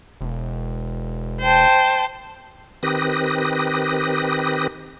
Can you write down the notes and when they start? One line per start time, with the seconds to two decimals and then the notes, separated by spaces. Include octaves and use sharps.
0.21 E1
1.42 C5 G5 A5
2.83 D#3 C4 G4 B4 D#6 A#6